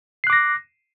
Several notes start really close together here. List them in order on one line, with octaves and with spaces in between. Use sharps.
C7 F#6 D6 A#6